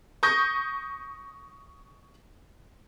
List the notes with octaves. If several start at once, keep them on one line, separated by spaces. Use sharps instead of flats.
C#6 D#6 G6 A#6